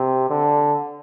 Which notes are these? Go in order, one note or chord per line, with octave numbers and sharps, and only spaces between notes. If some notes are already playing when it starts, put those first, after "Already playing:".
Already playing: C3
D3